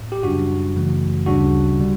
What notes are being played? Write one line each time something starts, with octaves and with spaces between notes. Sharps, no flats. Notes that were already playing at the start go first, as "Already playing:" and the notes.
Already playing: A2
G4
F#2 C#3 G3 D4 F#4
F#2 C#3 E3 A3
D2 C#3 G3 D4 F#4
D3 G3